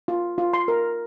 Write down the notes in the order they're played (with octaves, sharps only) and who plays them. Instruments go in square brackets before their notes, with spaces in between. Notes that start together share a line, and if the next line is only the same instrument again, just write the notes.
[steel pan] F4
F4
C6
A#4